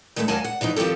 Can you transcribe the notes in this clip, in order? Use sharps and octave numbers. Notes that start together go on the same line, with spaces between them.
D#3 G#3 A3 B3 E4
D#2 F#3 A#3 G#5 A5
F#5
B2 E3 F3 D#4
D#3 F3 C4 G4 A4